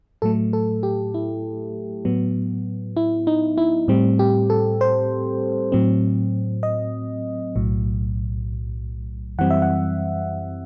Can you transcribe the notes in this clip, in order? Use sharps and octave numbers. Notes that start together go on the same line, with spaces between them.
A2 F#3 A3 A4
A4
G4
E4
A2 F#3 B3
E4
D#4
E4
A2 G3 C4
G4
A4
C5
A2 F#3 C4
D#5
B1 A2 F#3
F#2 E3 G3 C4 F#5
E5
F#5